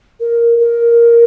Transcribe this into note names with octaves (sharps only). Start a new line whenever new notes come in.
A#4
A#4